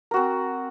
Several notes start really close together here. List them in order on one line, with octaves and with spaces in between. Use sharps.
A#4 F#4 C4